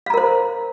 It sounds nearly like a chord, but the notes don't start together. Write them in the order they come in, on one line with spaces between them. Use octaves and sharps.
F5 A#5 A#4 C5